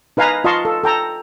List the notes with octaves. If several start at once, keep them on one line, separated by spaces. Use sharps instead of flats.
D#4 B4 F5 G#5 A#5
F4 D#5 F5 A5 C6 C#6
A4
A4 G5 A#5